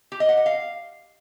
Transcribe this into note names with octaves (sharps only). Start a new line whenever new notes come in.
G4
D#5
F#5
D#5
F5